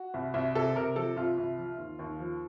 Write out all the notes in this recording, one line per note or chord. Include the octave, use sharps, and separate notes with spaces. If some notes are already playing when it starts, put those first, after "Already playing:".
Already playing: F#4
C2
C2
C3 A4
C3 A#4
F3 A4
C2 F4
C2
F3
D#2
D#2
F3